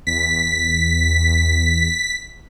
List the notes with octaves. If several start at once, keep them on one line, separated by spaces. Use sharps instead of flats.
E2 B6